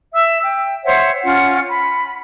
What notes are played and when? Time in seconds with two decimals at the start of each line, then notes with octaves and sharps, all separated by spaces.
0.14 E5 E6
0.43 G5
0.84 C5 C#5 E5 F#5
1.23 C#4 F4 F#5
1.68 B5